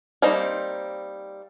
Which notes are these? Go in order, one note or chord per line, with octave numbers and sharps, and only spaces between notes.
G3 A#3 C4 D#4 C5